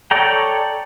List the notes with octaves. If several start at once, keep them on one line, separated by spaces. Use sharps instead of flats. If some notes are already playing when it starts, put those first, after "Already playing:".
A4 C#5 D5 G5 A#5